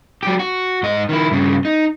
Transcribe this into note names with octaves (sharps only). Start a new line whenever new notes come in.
F#3 G4
F#4
G#2 D#5
D#3 E4
G2 C#3
D#4